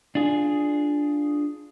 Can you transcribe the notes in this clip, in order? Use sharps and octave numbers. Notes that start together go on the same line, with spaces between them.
D4 F4 G#4